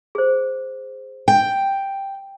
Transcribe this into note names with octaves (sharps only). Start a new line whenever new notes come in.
G#4 C5
G5